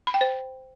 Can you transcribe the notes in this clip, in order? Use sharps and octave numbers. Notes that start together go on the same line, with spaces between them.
B5
G5
C5